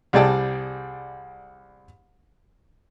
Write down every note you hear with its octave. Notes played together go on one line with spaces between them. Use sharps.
C2 G3 G#4 D5 G5 A5